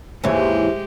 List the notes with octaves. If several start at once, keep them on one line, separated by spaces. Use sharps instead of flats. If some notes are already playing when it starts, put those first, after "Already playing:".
D#2 G#2 E3 G#3 G4 C5 C#5 E5